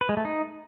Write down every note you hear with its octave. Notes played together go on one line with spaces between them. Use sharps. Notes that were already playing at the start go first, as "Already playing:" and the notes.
B4
G#3
A3
D#4